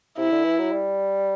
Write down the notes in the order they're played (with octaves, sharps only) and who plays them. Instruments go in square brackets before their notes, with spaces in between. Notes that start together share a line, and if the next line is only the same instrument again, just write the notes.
[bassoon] C3 [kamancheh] E4
[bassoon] D3
E3
F#3
G3